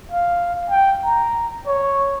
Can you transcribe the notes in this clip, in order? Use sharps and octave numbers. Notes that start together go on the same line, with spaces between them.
F5
G5
A#5
C#5